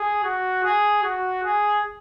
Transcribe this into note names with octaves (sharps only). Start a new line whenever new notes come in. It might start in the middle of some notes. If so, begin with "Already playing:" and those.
Already playing: G#4
F#4
G#4
F#4
G#4